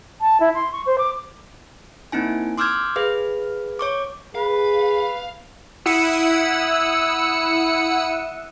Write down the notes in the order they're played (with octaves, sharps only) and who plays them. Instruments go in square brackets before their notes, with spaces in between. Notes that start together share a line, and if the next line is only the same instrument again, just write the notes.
[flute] A5
E4
C6
C#6
C5
D6
[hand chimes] A#3 C4 D#4 E4 G#5
C6 D6 E6 F6 G6 G#6
G#4 B4 F5
C#5 C#6 D6
[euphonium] G#4 [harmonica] B4 [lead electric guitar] F5
[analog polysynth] E4 F#5 D#6 E6 C#7